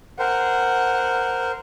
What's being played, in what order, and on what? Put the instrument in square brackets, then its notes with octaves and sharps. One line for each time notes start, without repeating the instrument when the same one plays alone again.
[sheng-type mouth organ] A#4 C5 [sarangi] F#5